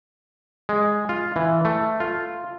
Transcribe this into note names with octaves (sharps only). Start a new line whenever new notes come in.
G#3
F4
E3
A3
F4